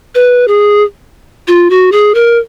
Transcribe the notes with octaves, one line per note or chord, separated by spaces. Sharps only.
B4
G#4
F4
F#4
G#4
A#4